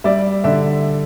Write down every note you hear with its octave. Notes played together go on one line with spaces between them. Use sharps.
G3 D5 E5
D3 D5 E5